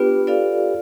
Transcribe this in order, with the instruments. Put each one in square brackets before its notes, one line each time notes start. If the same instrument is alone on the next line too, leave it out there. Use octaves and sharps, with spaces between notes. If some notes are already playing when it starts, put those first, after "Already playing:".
Already playing: [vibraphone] B3 D4 F4 [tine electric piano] G4 B4
[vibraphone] F4 A4 D5 F5